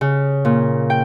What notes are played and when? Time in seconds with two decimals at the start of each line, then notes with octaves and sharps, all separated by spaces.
0.01 C#3
0.45 A#2
0.90 G5